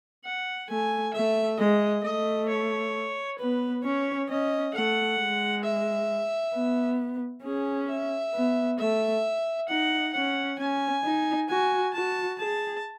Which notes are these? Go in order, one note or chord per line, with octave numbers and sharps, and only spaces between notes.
F#5
A3 G#5
A3 E5
G#3 D#5
A3 D#5
C#5
B3 B4
C#4 C#5
C#4 D#5
A3 F#5
G#3
E5
B3
C#4 G#4
E5
B3
A3 E5
D#4 F#5
C#4 F#5
C#4 G#5
D#4
F#4 G#5
F#4 A5
G#4 A5